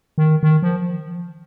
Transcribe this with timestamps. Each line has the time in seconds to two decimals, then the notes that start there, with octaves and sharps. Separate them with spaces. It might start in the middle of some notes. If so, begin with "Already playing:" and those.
0.18 D#3
0.43 D#3
0.63 F3